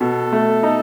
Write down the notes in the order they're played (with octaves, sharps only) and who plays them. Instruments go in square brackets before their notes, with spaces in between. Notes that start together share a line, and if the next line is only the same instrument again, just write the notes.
[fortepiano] B2 [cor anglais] A4
[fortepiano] A3
D#4